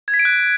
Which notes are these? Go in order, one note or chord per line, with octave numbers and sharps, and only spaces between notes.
G#6
B6
D7
F#6